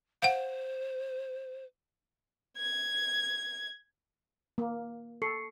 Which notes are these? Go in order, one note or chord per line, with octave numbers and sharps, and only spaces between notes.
C5 F5 F#5
G#6
A#3
A4 C#6 C7 C#7